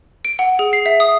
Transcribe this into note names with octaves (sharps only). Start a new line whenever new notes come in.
D7
F#5
G#4
C7
E5
D#6